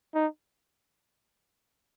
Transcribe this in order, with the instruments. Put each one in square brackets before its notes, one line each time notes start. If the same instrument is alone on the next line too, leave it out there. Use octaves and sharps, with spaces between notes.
[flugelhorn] D#4